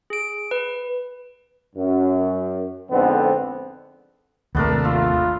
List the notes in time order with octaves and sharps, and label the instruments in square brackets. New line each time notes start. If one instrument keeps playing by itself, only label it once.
[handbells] G#4 D7
B4
[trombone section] F#2
F2 G#2 D3 B3 C4
[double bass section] G#1 A3 [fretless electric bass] D#2 C3 [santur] B3 D4 A#4
[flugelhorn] F4 [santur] E5